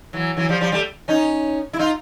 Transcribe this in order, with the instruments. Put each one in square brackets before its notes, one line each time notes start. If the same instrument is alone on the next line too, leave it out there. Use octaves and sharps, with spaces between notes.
[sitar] E3 F#3
E3 F#3
F3 G3
F3 G3
G3 A3
C#4 D#4
E4
D#4 F4